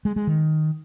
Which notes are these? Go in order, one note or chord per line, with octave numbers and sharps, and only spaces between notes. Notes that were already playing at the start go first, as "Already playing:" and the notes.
G#3
G#3
D#3